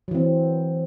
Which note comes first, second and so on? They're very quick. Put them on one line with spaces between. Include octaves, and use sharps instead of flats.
F#3 E3 C4